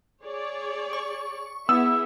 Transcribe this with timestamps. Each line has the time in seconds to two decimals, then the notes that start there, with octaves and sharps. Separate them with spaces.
0.24 G#4 C#5 D5
0.93 C#6
1.69 B3 E4 G#4 E5 E6